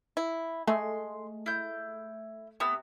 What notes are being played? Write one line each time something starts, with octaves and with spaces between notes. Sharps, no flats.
E4
G#3 A3 C6
E4 G6
C3 B3 E6